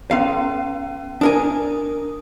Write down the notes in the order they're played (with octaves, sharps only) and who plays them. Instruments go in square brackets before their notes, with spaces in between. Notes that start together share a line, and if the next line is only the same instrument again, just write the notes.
[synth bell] B3 C#4 [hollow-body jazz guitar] F5
[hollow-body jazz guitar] D4 A#4 G#5 [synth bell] D#6